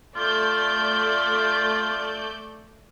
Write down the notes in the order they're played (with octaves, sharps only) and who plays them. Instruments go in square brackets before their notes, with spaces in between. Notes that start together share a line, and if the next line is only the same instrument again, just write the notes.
[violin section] A3 D5 G6 [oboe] F4